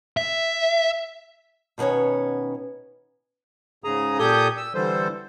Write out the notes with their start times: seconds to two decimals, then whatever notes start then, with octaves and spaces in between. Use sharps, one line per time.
0.17 E5
1.78 B2 D#3 B3 C#4 C#5
3.84 G#2 C#3 G#4 A#5 D#6
4.19 A#2 G4 A4 G#5 D#6 G6
4.57 E6
4.75 D3 E3 G3 A4 C5